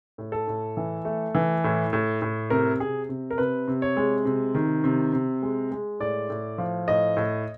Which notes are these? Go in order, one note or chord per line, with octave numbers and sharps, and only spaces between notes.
A2
A4
A2
E3
A3
E3
A2
A2
A2
C3 A#4
C3 G#4
C3
A#4
C3 B4
C3
C#5
G#3
C3
D#3
C3
C3
G#3
G#3
A2 D5
A2
F3
A2 D#5
A2